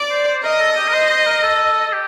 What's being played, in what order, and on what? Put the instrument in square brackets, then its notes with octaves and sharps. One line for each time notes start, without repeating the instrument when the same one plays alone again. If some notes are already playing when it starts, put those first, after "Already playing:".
Already playing: [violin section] D5
[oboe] C5
C5
[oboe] A#4 [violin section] D#5
[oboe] A4
A4
G4
A#4
C5
C5
A#4
A4
A4
G4